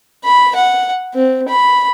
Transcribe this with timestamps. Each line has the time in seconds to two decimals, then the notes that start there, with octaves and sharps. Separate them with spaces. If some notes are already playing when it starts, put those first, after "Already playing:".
0.24 B5
0.56 F#5
1.14 C4
1.49 B5